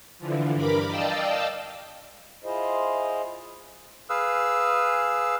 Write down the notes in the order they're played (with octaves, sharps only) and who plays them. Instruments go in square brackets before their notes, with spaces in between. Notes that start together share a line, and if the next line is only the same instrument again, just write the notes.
[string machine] D3 E3 F3
G2 A#4 B5 D6
D5 D#5 F5 G5 A5 E6
[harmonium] E4 F4 G#4 C5 D#5
[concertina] G#4 B4 F5 E6